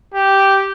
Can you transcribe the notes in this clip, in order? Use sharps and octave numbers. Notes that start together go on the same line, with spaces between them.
G4